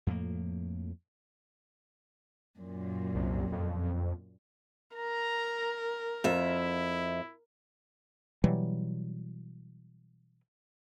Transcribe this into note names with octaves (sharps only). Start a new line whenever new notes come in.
F2 A2 F3 A#3
F#2 A#2
C2
F2
A#4 A#5
F2 E4 E5
B2 E3 F#3 G3